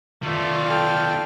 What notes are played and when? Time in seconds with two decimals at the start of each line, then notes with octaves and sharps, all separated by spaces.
0.23 D#3 A3 B3 F4 D5
0.69 A4 G5 F6